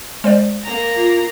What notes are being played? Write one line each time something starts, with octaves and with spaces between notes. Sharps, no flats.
G#3 C5 D5
A#3 A#5
F4